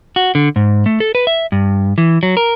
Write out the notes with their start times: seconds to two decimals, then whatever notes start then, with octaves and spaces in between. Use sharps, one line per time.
0.16 F#4
0.35 D3
0.56 G#2
0.86 A3
1.00 A4
1.15 B4
1.27 E5
1.52 G2
1.98 E3
2.23 F#3
2.37 A#4